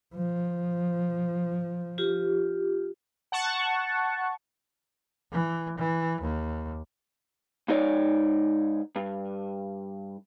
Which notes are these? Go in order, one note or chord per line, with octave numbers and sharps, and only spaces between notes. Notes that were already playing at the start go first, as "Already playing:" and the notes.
F3
F4 G4
F#5 A5 C#6
E3
E3
D#2
G#2 D#4 C#5 D5
G2